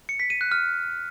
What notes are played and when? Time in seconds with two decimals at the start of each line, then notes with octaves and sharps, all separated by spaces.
0.09 C#7
0.20 B6
0.30 D#7
0.41 F#6
0.51 F6